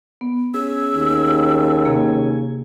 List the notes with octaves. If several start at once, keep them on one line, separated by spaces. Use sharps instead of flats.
B3
C#4 G#4 G#5 E6
D#2
C3 A#3